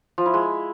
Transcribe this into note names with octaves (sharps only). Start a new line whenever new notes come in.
F3
E4
G#3